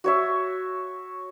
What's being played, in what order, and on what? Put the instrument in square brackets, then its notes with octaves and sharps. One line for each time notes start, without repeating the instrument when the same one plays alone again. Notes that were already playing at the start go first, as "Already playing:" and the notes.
[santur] F#4 C#5 E5